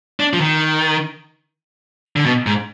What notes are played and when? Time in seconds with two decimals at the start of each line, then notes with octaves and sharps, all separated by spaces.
0.20 D4
0.33 F3
0.40 D#3
2.16 D3
2.26 B2
2.46 G#2